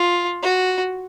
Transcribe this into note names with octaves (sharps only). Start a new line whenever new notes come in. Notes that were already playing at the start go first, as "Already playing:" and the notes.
Already playing: F4
F#4